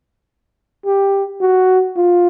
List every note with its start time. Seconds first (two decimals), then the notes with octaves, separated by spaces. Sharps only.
0.86 G4
1.41 F#4
1.96 F4